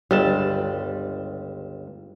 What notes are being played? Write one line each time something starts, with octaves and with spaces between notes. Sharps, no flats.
G1 C#2 G3 A5